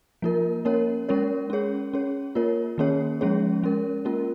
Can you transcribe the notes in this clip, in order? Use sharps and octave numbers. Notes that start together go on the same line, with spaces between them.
F3 A#3 F4 A#4
A#3 C#4 A#4 C#5
G#3 C#4 A#4 C#5
C#4 G#4 C#5
C#4 G#4 C#5
A#3 F4 A#4 C#5
D#3 A#3 C#4 G#4 C#5
F3 G#3 C#4 G#4 C#5
G#3 C#4 A#4
A#3 C#4 F4 A#4